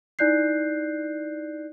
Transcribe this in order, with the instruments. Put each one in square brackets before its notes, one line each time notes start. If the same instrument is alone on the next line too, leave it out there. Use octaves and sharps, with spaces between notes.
[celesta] D#4 E4 D5 F#6 G6 C7